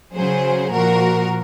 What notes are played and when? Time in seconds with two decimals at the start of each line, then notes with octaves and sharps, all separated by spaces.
0.15 C#3 F#3 G#4 C5
0.72 A#2 F3 F#4 A#4